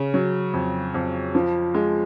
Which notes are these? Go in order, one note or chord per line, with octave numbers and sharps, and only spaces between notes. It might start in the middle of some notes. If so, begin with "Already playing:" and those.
Already playing: C#3
F#3
F2
F2
F3
G#3